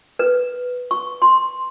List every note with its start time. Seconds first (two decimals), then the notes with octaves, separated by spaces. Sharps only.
0.19 B4
0.91 C#6
1.22 C6